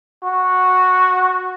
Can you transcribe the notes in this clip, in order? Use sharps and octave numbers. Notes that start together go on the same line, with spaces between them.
F#4